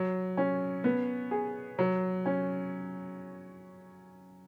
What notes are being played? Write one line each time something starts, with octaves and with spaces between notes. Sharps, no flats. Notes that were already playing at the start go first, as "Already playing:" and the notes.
Already playing: F#3
C#4
B3
G#4
F#3
C#4